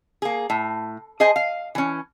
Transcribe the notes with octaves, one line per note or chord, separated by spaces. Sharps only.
A#3 G#4
A2
G#4 C5 D#5 G#5
F5
E3 C#4